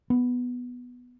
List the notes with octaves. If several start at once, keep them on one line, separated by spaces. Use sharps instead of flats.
B3